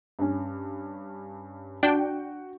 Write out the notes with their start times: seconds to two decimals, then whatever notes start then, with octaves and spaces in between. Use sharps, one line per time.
0.19 G2 C#4
1.83 D4 F#4 G5